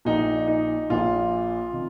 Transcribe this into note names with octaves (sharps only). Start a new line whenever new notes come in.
A#1 A#2 D#4
D#4
A#1 A#2 F4
C3 D#3